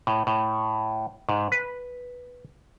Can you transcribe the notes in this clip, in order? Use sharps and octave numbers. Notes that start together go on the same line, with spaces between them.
A2
A2
G#2
B4